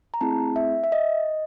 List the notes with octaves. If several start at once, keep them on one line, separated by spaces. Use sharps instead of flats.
A#5
A3 C4 E4 G#4 A5
E5
E5
D#5